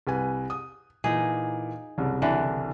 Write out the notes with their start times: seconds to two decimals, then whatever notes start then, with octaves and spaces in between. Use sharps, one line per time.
0.07 C2 B4 G#5
0.50 D#6
1.04 A#2 E3 D#4 G#4
1.98 F#1 C2
2.22 D3 E3